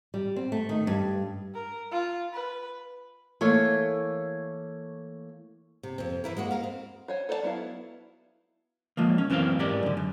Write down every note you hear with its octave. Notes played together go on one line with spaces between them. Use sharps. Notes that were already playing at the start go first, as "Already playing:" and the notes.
G3
C4
A3
D#3
G2
A#4
F4
B4
E3 A3 A#3 C#5
C3
F2 C4
E3 E4 A#4
G#3 A#3 F#4
A#4 F5
C4
C5 C#5 G#5
A4 C5 D5 D#5 A5
F#3 B3 E4 F5
F3 G#3 A#3
C#4
F#2 E3 B3 C4 A#4 F5
G#2 G4 A#4 D5
F#2 D3
F#2